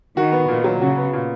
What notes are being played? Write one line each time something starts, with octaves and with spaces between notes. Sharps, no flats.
D#3 F#4
B3
A#2 D#3
F#3
C#3 F#4
B3
A#2